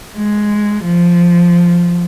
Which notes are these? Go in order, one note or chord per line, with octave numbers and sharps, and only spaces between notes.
G#3
F3